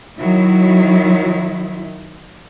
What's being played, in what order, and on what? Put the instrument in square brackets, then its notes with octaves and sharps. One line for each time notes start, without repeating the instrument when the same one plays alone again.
[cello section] D#3 F#3 E4